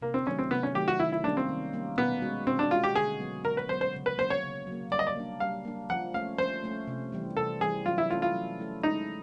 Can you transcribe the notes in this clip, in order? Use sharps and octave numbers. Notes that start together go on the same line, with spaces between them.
C3 A#3
C4
D#3 F#3 A3 C#4
C4
C3 B3
C#4
D#3 F#3 A3 G4
F#4
D#3 E4
E4
G3 A#3 C#4 D4
C4
D#3
G3 A#3 C#4
B2 B3
G#3 C#4 F#4
B2 C4
D4
G#3 C#4 F4 F#4
G4
D3 G#4
F#3 B3
D3 A#4
B4
F#3 B3 C5
C5
C#3
B4
F#3 A#3 C5
C#5
C#3
F#3 A#3
G3 D5
D#5
D5
A#3 D4
G3 F5
A#3 D4
F3 F#5
A3 C#4 F5
F3 C5
A3 C#4
C3
E3 G3 C4
C3 A4
E3 G3 C4 G#4
F#3 F4
E4
A3 C#4 E4 F4 A4
F4
F#3
A3 C#4 E4 A4
G#3 D#4